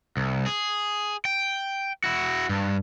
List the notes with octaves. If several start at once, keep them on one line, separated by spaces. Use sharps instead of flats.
C2
G#4
G5
E4 F#4
G2